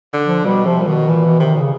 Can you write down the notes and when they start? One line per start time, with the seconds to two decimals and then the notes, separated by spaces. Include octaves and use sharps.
0.14 D3
0.25 F3
0.45 B2 G3
0.66 C3 F3
0.82 A#2
0.87 B2 D#3
1.08 A#2 E3
1.24 B2
1.40 C3 D#3
1.56 A#2
1.60 C#3